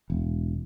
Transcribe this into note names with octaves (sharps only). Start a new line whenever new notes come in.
E1